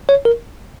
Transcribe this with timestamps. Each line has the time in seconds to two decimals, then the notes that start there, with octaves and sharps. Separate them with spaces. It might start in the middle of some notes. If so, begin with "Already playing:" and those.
0.09 C#5
0.25 A#4